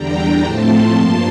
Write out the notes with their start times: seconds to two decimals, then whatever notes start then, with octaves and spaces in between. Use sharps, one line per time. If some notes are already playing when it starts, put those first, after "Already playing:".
Already playing: E2 D3 G3 D4 G5 A#5
0.44 A2 F3 A3 C4 A5 C6
0.95 G2 F3 A#3